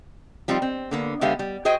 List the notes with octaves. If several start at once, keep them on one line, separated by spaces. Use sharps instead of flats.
F3 G3 C4 D#4 F4
C4
D3 A#3 B3
D3 G#3 B3 G4 E5 F5
G3
F#4 G#4 C5 D#5 G5 G#5